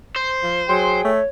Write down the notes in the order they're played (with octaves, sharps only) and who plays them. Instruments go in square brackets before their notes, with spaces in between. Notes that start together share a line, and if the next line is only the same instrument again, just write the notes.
[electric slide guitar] C5
[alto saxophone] F3
[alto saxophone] F#3 [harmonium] G#4 G5 [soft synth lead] C6
[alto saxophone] A3 [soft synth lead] C#5